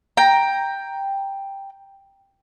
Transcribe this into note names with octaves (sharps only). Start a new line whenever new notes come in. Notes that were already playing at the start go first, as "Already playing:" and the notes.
G5 A#5